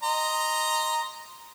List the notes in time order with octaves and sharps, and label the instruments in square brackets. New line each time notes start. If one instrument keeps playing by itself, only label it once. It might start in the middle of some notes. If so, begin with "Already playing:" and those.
[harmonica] D#5 A#5 C6